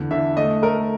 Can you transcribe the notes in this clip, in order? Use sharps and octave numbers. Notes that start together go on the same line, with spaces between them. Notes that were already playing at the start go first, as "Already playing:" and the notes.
Already playing: E2 D3
D3 E5
A3 D#5
A3 A#4